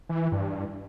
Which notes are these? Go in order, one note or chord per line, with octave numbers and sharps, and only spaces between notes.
E3
E3
G2